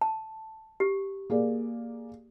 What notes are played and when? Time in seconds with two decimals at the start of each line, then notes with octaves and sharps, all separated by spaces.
0.01 A5
0.80 G4
1.30 A#3 G#4 D5